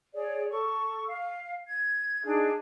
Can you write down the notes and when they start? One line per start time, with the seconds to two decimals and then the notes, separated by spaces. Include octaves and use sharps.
0.14 G#4 C#5 D5
0.51 A4 C#6
1.08 F5
1.67 G#6
2.25 D4 D#4 G#4